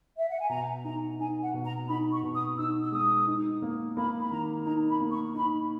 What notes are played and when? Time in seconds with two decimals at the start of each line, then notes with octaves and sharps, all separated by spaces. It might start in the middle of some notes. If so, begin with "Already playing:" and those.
0.18 E5
0.30 F#5
0.40 G#5
0.49 B2 A#5
0.84 D#4 A#5
1.19 D#4 G#5
1.43 F#5
1.54 B2
1.65 A#5
1.89 D#4 B5
2.12 C#6
2.23 B2
2.35 D#6
2.58 D#4 E6
2.84 E6
2.92 G#3 D#6
3.27 D#4
3.62 A#3
3.96 A#3 B5
4.21 B5
4.31 D#3 A#5
4.65 D#4 A#5
4.89 B5
5.01 A#3
5.11 C#6
5.35 D#4 B5